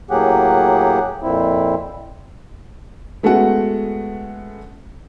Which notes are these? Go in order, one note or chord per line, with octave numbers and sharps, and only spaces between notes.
A2 F#3 A#3 G4 G#4 F#5
F2 A#2 C4 E4
G#3 A3 B3 C#4 F#4 F#5